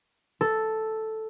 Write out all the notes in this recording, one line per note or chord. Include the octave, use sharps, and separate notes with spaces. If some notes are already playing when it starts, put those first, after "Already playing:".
A4